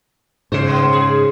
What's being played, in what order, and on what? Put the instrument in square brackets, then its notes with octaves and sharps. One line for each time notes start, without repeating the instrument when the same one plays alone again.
[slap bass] G#2 C#3 [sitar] C5
[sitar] G3 B3
G#4